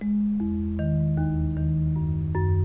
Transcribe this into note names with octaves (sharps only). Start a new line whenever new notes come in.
G#3
E2
D#3
D#2
D#3
F#2
F#2